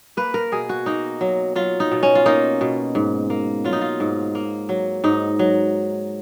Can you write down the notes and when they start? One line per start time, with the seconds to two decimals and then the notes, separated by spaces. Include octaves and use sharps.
0.17 A#3 B4
0.34 A#4
0.52 B2 G#4
0.69 F#4
0.86 A#3 D#4
1.21 F#3
1.56 F#3 F4
1.80 D#4
1.92 B2
2.03 C#4
2.15 F4
2.26 A#3 D#4
2.61 B2
2.95 G#2
3.30 A#3
3.64 F#3 F4
3.73 D#4
3.81 F4
4.00 G#2
4.35 A#3
4.69 F#3
5.04 G#2 D#4
5.39 F#3